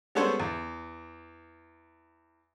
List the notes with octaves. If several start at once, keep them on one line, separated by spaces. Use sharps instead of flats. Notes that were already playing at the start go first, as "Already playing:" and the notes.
G3 G#3 B3 A4 C5 C#5
E2